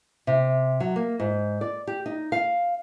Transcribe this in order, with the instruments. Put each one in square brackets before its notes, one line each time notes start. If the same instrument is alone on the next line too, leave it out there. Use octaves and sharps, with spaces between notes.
[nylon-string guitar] C3
F#3
A#3
G#2
D5
G4
D#4
F5